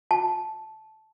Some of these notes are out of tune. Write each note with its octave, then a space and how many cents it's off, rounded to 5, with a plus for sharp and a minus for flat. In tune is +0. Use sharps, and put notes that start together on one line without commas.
A5 -10